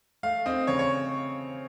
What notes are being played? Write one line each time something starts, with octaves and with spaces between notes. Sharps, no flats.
A3 F5
C4 D#5
C#3 C#5
C#5